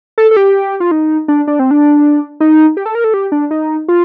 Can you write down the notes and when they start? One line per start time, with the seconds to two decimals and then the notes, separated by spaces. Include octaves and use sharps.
0.18 A4
0.31 A4
0.37 G4
0.80 F4
0.91 D#4
1.28 D4
1.47 D4
1.59 C4
1.71 D4
2.40 D#4
2.77 G4
2.86 A4
2.95 A#4
3.04 A4
3.14 G4
3.32 D4
3.51 D#4
3.88 F4